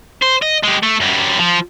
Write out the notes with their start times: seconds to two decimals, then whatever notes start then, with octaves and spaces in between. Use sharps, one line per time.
0.22 C5
0.42 D#5
0.63 G#3 G4
0.83 A3
1.00 F#2 G3
1.39 F3